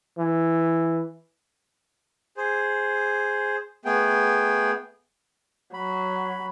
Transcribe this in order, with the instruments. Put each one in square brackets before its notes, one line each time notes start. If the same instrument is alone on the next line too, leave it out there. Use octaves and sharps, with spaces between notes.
[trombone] E3
[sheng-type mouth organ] G#4 C5
A3 B3 G#4 G5
[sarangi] F#3 [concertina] B5